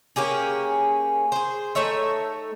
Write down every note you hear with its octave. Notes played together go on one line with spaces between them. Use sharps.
A#3 C#4 G4 G#4
G#4 C5
A3 D#4 C#5 E5